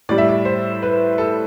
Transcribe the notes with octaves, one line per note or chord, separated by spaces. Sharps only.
A2 G3 D5
E5
D5
C5
B4
A4